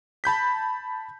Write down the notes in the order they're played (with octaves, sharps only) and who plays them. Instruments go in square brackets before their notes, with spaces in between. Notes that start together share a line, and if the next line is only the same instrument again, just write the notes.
[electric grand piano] A5 B5 G6 B6